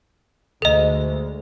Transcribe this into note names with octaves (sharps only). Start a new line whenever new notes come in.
D2 G#3 A4 D#5